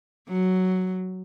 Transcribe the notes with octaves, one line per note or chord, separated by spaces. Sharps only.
F#3